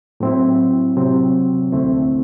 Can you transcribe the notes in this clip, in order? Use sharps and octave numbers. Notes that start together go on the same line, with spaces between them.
A2 F#3 C4 E4
C3 F#3 C4
D2 D3 A3 C4 E4